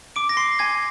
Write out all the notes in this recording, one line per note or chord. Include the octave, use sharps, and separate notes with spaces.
D6 D7
A#6
C6 C7
G#5 G#6